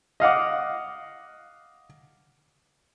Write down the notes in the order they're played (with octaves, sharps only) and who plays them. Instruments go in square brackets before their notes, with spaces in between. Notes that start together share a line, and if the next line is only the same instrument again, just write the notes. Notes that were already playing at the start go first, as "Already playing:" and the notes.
[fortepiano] D#5 F5 F#5 D6